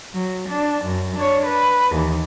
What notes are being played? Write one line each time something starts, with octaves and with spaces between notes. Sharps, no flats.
F#3
D4
F#2
D4 C#5
B4
D#2 E3